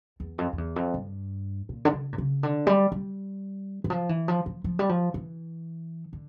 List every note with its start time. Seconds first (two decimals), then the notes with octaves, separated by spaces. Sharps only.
0.20 E2
0.38 F2
0.53 F2
0.58 E2
0.76 F2
0.94 G2
1.69 A#2
1.85 D3
1.93 C#3
2.13 A#2
2.18 C#3
2.43 D3
2.67 G3
2.92 G3
3.84 E3
3.90 F3
4.09 E3
4.28 F3
4.46 F3
4.64 F3
4.79 G3
4.89 F3
5.14 E3
6.13 D3